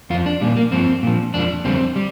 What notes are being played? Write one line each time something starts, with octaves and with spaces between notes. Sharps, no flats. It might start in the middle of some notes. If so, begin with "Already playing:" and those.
F2 F3 F4
D4
A#2 G3
A#3
G2 F3 C4
A#2 F3
F2 F3 D4
F2 D3 G3 C4
G3